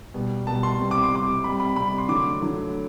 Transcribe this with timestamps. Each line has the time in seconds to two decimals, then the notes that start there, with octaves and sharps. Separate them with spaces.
0.14 B2 G3
0.47 B2 G3 A5
0.63 C6
0.79 C3 G3
0.91 D6
1.03 C6
1.12 C3 G3 D6
1.44 C3 G3 B5
1.60 B5
1.76 C3 G3 B5
1.98 C6
2.09 D3 F#3 A3 D6
2.41 D3 F#3 A3